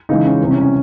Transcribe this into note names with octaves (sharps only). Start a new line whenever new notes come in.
C#3 E3 G#3 D#4
C#4
C3 E3 G3
C#4
C#4